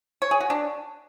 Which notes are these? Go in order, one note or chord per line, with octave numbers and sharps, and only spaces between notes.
C#5
G#4
F#4
D4